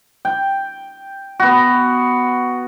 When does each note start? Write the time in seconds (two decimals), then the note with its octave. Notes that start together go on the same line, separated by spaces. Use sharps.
0.25 G5
1.40 B3 F#4